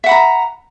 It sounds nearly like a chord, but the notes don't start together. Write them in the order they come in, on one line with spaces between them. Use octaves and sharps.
E5 F#5 B5 A#5